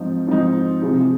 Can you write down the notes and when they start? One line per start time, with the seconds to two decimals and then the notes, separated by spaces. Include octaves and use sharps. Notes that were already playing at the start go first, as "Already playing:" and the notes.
Already playing: G#2 F3 C4 D#4
0.27 G#2 F3 C4 D#4
0.82 C3 F3 G#3 D#4